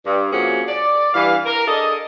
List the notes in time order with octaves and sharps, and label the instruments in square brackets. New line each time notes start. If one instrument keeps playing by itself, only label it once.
[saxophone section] G2
C3 F3 A#3 C#4 F#4 G#4
D5
G2 E3 F5
A#4
D4 G#4 A4 D#5